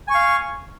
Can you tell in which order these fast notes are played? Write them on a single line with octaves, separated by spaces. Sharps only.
G#5 C#6 F5